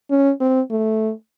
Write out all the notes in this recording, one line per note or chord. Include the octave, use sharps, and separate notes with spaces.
C#4
C4
A3